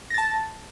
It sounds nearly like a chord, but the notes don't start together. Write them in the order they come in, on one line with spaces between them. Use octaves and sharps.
A#6 A6 A5